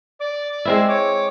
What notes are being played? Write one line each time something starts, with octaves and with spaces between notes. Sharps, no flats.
D5 D6
G#3 C4 E4
C#5 D6